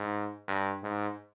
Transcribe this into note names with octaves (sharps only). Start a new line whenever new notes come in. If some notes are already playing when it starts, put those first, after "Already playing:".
Already playing: G#2
G2
G#2